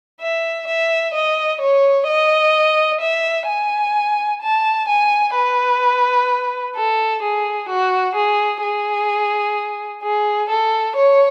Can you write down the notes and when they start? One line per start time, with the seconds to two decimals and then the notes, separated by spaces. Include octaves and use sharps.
0.21 E5
0.67 E5
1.14 D#5
1.61 C#5
2.08 D#5
3.01 E5
3.48 G#5
4.42 A5
4.88 G#5
5.35 B4
6.76 A4
7.23 G#4
7.69 F#4
8.16 G#4
8.62 G#4
10.03 G#4
10.49 A4
10.96 C#5